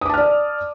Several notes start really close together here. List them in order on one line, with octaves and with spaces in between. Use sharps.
D#6 D6 A5 F6 D5